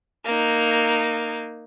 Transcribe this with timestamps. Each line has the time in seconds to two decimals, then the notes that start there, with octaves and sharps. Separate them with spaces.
0.25 A#3 D#4